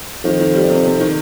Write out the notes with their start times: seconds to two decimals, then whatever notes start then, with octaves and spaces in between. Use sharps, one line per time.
0.25 F2 D#3
0.40 D#3
0.55 G3
0.70 C3
0.86 C3
1.00 D#3